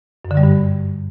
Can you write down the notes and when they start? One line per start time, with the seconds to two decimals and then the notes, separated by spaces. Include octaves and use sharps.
0.25 F#2
0.31 D3
0.37 G3
0.43 G2